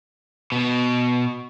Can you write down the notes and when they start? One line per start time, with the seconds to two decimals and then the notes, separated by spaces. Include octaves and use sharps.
0.52 B2